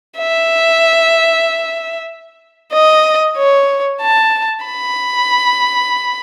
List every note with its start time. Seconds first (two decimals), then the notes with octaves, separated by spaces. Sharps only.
0.18 E5
2.73 D#5
3.37 C#5
4.01 A5
4.65 B5